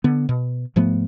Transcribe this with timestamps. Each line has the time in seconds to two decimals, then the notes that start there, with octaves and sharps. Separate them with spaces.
0.04 D3 B3
0.29 B2
0.76 G#2 F3 A3 B3